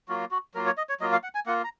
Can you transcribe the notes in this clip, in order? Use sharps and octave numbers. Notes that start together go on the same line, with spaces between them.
F#3 A#3 F4 F#4
F#4
F#3 A#3 F4 A#4
C#5
D#5
C#5
F#3 A#3 F4 D#5
F5
F#5
G#5
A#3 F4 F#5
A#5